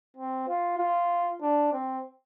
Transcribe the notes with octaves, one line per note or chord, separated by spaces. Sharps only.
C4
F4
F4
D4
C4